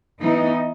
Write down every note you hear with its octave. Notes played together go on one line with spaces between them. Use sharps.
E3 B3 D#4